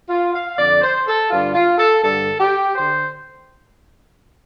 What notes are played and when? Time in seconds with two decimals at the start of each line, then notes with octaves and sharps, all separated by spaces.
0.09 F4
0.33 F5
0.58 F2 D3 D5
0.82 C5
1.06 A4
1.30 G2 D3 F4
1.55 F4
1.78 A4
2.03 G2 D3 A4
2.39 G4
2.75 D3 C5